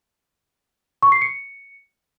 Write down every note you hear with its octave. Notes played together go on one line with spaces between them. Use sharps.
C#6
C7
C#7